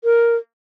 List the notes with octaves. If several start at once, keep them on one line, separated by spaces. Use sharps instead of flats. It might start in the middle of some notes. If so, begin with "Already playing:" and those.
A#4